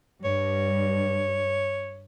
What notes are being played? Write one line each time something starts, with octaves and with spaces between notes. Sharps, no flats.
G2 C#5